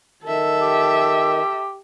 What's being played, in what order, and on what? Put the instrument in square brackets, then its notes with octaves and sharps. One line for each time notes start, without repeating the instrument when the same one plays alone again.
[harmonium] D#3 [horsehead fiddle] A4 E5
[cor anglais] G4